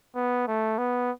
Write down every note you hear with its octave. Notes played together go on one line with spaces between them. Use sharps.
B3
A3
B3